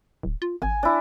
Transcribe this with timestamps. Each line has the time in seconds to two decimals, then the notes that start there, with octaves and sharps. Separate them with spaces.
0.23 D1
0.42 F4
0.62 G#1 G#5
0.83 D4 E4